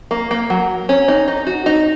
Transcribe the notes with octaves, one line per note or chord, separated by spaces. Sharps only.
A#3
A#3
F#3
C#4
D#4
D#4
F#4
D#4